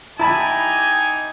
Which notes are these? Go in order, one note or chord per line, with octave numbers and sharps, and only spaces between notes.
D#4 E4 G4 G#5 A5 B5